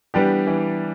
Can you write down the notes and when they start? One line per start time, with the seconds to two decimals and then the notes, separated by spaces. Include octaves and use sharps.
0.14 E3 G3 B3 D4 G4
0.47 E3